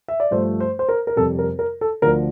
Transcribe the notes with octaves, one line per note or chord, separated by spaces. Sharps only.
E5
D5
G2 F3 A3 C5
C5
C5
A#4
A#4
F2 C3 G3 A4
A#4
A#4
A4
D2 D3 F3 A#4